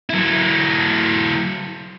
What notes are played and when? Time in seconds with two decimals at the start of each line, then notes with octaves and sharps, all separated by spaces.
0.10 F#3 E4